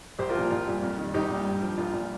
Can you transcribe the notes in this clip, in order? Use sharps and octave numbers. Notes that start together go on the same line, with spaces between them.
A#1 G4 C5
F4 A#4
A#2 F3
A#1 F4
A#2 G3
F2
D#3
G3
A#1 D#4 G4
A#2 G3
G2
F3
A#1 F4
A#2 G3